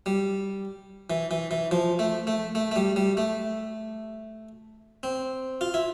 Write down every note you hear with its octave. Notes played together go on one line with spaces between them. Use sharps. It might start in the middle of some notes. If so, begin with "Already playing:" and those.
G3
E3
E3
E3
F3
A3
A3
A3
A3
G3
G3
A3
C4
F4
E4